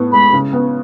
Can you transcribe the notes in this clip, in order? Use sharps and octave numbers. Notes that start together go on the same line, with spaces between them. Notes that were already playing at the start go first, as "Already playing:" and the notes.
Already playing: A2 B3
G#3 B5
C#3
B3